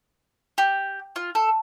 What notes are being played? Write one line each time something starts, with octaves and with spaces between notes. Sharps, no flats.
G4
F4
A4